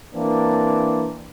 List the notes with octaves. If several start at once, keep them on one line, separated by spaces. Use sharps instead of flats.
E3 A#3 C4 D4